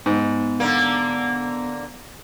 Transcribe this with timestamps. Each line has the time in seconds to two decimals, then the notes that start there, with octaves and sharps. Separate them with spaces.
0.06 G#2 B3
0.60 D3 A#3